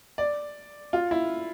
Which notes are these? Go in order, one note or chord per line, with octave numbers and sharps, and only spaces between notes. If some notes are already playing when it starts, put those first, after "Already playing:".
D5
F4
E4